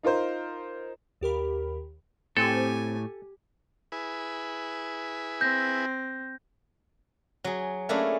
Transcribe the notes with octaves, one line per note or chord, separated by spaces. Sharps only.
D#4 F4 A#4 C5
D#2 G4 A#4 B5
A2 C4 G4 A4 G#5
E4 G#4 B4
C4 G6 A#6
F#3 G#4
A3 A#3 C#4 D4 E4 G#4